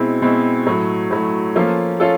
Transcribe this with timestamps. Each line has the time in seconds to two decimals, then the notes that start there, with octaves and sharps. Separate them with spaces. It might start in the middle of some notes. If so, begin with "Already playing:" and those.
Already playing: B2 G#3 C4 E4
0.22 B2 G#3 C4 E4
0.66 A2 F#3 A3
1.11 A2 F#3 A3
1.55 F3 A#3 C#4 F4 A4
2.00 C#4 F4 A4